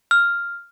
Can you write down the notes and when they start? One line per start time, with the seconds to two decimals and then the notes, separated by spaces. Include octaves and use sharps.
0.11 F6